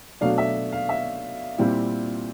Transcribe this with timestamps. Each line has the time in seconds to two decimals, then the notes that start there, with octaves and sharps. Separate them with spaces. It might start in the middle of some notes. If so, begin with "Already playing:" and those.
0.21 B2 F#3 A3 D4 F5
0.38 E5
0.72 F5
0.89 E5
1.58 A#2 G3 C4 E4